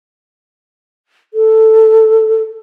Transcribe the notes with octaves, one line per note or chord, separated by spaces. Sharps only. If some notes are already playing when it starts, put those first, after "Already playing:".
A4